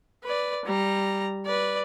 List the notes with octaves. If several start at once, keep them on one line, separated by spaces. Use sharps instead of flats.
B4 D5
G3 A#5
B4 D5